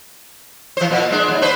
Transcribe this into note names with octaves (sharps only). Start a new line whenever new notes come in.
E3 C5
A#2
G#3 D4
D#2
D4 B4 C5